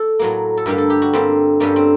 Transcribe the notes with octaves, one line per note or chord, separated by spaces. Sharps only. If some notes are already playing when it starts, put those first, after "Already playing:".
Already playing: A4
A2 F#3 A#3
A4
G2 D3 G3 A#3 A#4
A4
G4
F#4
G2 D3 G3 A#3 C4
G2 D3 G3 A#3 C#4
C4